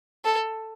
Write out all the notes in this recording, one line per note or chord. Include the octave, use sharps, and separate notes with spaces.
A4